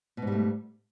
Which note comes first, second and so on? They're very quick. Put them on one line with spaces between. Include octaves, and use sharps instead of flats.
B2 G#2 G3 A3